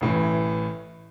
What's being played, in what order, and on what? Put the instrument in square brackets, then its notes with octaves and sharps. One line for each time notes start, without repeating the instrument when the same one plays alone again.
[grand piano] A1 A2 E3